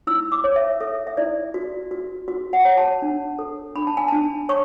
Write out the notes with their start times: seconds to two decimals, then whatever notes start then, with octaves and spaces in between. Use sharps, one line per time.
0.07 E4 E6
0.32 D6
0.44 C#5
0.56 E5
0.80 A4 E5
1.07 E5
1.17 E4 D5
1.54 F#4
1.91 F#4
2.28 F#4
2.53 F#5
2.65 C#5
2.77 A5
3.02 D4
3.39 A4
3.75 D4 B5
3.87 A5
3.97 G#5
4.08 D4 A5
4.49 C#5 C#6